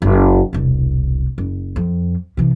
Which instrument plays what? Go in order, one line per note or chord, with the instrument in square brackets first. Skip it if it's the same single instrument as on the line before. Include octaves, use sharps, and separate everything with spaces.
[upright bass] F#1
E1 C2
F#1
F2
C3 E3